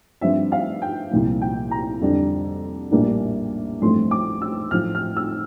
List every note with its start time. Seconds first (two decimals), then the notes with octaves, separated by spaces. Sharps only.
0.21 G2 F3 C4 E5
0.52 F5
0.82 G5
1.11 C2 A#2 F3
1.41 G5
1.71 A#5
2.01 F2 D3 G3 D4
2.91 A#1 A2 G3 A#3 D4
3.81 A1 G2 F3 A3 C4 C6
4.11 D6
4.42 E6
4.71 A1 A2 F3 F6
4.95 F6
5.17 E6